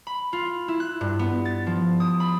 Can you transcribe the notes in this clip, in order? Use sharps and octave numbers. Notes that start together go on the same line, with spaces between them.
B5
F4
E4
F#6
G2
B3
A6
F3
D#6
B5